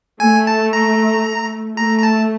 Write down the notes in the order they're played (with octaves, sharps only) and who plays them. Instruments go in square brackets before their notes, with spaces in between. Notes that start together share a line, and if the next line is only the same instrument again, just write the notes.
[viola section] A3 [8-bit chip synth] G#5
[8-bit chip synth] A5
A#5
[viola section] A3 [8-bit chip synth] A#5
[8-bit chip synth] A#5
A5